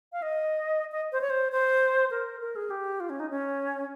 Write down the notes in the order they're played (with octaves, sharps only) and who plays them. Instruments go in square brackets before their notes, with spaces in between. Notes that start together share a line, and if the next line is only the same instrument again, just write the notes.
[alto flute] F5
D#5
D#5
C5
C#5
C5
C5
A#4
A#4
G#4
G4
F4
C#4
D#4
C#4